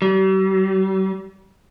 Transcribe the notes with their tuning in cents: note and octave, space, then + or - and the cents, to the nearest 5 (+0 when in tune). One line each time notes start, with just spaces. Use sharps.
G3 -45